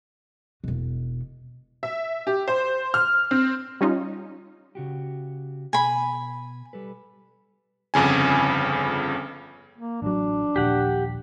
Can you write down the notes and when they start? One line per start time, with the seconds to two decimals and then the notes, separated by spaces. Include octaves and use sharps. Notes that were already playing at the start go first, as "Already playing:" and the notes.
0.64 E1 B2
1.83 E5
2.27 G4
2.48 C5
2.94 F6
3.31 C4
3.81 G3 C#4 D#4 F4
4.75 C#3 F#4 G4
5.73 B2 G#5 B5
6.73 G3 A4 B4
7.94 G1 F2 C#3 G#5
9.77 A#3
10.02 A1 F#3 D4
10.56 D#1 A#1 G4 F#5